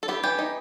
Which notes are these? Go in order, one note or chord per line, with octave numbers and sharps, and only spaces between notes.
A4
B3 G4
E3 G4
D#4